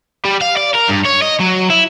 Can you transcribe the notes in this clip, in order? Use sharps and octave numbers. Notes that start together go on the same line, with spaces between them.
G3
F5
D5
A#4
G2
C#5
D#5
F#3
E4